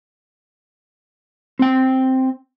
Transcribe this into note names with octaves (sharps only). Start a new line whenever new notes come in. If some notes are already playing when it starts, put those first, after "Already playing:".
C4 G5